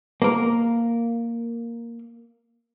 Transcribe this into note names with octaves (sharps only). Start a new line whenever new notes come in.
A#3 A#4